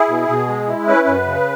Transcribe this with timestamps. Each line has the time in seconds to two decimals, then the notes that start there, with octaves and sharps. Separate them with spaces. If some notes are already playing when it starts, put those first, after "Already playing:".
Already playing: E4 G#4
0.09 B2
0.28 B2
0.48 G#3
0.68 E4
0.87 C#4 B4
1.07 F#2
1.26 C#3